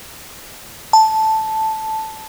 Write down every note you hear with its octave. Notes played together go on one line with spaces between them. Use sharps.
A5